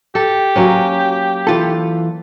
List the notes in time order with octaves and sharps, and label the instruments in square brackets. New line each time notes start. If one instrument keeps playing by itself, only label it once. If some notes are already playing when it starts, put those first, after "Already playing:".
[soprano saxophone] G4 [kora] A4
[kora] F#3 A#3 C#4
[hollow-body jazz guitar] E3 F4 A4